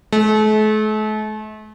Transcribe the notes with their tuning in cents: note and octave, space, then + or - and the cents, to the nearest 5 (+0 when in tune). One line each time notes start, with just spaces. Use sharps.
A3 -40